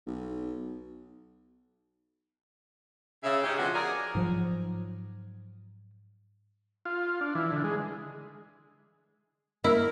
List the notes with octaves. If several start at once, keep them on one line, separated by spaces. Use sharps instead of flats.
B1
C#3 E5
G#2 C#4 D#4 G4
B2 D3 F3 F#4 G#4 F#5
G#4 A#4 D5
G#2 F3 F#3
F4
D4
E3
D3
G#3
A#3 E4 A#4